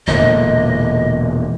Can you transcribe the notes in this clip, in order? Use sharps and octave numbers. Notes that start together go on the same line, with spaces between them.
E1 A#2 D3 D#5